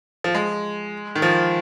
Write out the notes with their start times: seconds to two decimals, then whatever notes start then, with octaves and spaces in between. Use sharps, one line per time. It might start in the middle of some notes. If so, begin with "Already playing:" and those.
0.24 F3
0.35 G#3
1.15 D#3
1.22 F3